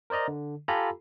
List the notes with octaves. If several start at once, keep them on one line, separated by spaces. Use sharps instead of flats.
A#4 C5 D5 D#5 A#5
D3
F4 G4 A4 G#5 A#5 B5